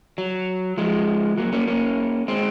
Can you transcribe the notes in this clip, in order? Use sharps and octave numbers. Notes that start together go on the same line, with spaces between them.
F#3
F3 G#3
F#3 A#3
A#3 C#4
A#3 C#4
G#3 C4